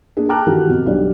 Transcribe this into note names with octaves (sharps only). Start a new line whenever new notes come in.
A#3 D4 G#4
G5 A5 A#5 D6 F6 F#6
D#3 E3 F#4 G4 A4
F2 B2
B1 G3 D4 D5